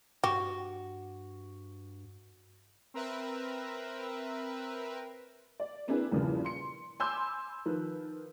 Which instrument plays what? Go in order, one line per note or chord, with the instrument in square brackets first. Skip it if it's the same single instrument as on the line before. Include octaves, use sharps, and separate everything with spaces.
[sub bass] G2 [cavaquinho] F#4 [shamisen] G4
[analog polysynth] C4 A#4 B4 E5
[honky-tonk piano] D5
A#3 C4 D4 E4 G#4 B4
E2 G2 A#2 C#3 E3 F3
C6 C#7
G#5 B5 C6 D6 E6 G6
D#3 F3 B4